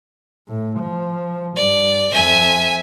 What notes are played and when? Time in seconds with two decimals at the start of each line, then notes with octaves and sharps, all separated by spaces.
0.48 A2
0.79 F3
1.57 G2 D5
2.13 F2 E5 G#5